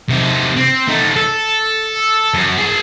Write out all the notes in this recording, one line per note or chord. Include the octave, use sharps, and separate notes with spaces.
C3 D#4
C4
A3 D#4
A4
F#2
G#4 A5